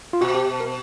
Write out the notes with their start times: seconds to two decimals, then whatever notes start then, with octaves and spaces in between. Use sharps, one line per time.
0.13 F4
0.21 B2 F#4
0.35 G4
0.60 A#4